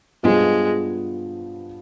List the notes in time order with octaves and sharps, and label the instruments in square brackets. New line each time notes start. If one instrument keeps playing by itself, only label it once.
[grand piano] G2 F3 B3 [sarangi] G#3